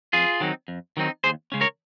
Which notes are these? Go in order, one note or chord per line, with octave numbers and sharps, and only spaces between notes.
F2 F4 G#4
D#3 F#3 C4 D#4
F2
D#3 F#3 C4 D#4
D#2 G#4 C5
C#3 G#3 C#4
A#4 C#5